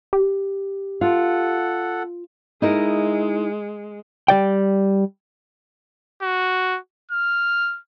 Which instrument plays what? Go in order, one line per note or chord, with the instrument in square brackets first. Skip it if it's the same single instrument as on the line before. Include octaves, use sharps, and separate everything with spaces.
[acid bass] G4
[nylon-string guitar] F4 [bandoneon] A4 F#5
[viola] G#3 [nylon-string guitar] D#4 E4 A#4
[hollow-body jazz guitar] G3 D5 G5
[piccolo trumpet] F#4
F6